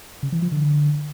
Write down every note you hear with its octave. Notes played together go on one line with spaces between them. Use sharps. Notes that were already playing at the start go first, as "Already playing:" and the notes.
C#3
E3
F3
D3